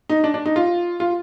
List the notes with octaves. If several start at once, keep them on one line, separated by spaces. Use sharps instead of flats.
D#4
D4
D4
D#4
F4
F4